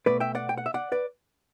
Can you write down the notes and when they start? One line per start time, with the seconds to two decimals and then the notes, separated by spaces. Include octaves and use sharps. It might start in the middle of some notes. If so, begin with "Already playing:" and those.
0.06 B2 A3 B4 D5
0.20 E5 G5
0.35 D5 F#5
0.49 G5
0.58 F#5
0.66 E5
0.74 D5 F#5
0.92 B4 D5